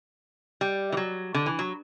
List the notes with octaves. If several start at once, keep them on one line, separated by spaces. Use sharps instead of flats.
G3
E3
F#3
D3
E3
F#3